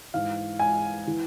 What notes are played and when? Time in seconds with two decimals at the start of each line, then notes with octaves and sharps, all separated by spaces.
0.14 G#2 E3 F5
0.59 G#5
1.07 E3